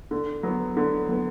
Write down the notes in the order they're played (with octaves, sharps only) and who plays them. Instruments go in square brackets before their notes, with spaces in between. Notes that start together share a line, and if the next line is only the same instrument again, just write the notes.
[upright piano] D3
F#3 B3
D3
F#3 B3